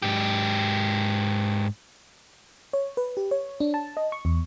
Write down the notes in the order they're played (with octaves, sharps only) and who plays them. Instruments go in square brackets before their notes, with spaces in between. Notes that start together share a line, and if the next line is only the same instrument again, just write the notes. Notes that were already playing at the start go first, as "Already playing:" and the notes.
[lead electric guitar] G#2 G4
[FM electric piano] C#5
B4
G4
C#5
D4
A5
D#5
C#6
E2